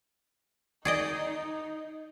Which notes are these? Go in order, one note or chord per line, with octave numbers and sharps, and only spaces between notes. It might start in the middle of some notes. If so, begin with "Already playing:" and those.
D#4 G#4 D5 D#5